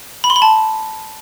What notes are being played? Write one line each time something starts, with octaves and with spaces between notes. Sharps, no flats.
B5
C6
B5
A5